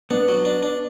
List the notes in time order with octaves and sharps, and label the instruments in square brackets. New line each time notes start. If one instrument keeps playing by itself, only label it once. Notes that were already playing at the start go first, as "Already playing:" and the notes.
[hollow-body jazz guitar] B3 [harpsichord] D4
[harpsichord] F#3
D4
D4